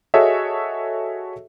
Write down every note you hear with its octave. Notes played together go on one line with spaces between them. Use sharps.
F#4 G#4 A4 C#5 D#5 E5